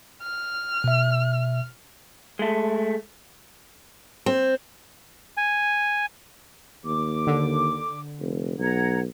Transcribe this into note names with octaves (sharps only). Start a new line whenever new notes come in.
F6
B2 E5
G#3 A3
C4
G#5
D#2 D6
D3
F1
B1 F#5 A#5 G#6